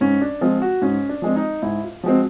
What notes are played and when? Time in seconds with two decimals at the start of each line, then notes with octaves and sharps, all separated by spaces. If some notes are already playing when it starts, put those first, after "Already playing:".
0.01 G#2 C#4
0.21 D4
0.41 F3 G#3 C4 F4
0.62 F#4
0.82 G#2 C#4
1.09 D4
1.22 F3 G#3 C4
1.36 D#4
1.62 G#2 E4
1.84 F4
2.03 F3 G#3 C4 F#4